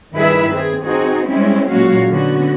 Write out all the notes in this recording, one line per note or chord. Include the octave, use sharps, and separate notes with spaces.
G2 D#3 E4 G#4 B4 E5
C4 G#4
C4 D#4 F#4 G#4
G3 G#3 C4 C#4 E4
A#2 F#3 G#3 C#4 F#4 F5
D3 B3 C#4 F#4